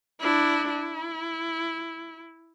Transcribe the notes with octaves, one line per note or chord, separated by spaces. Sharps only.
D4 E4
E4